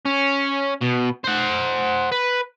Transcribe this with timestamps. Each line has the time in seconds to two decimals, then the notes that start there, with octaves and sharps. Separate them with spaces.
0.06 C#4
0.81 B2
1.24 C5 F#5
2.12 B4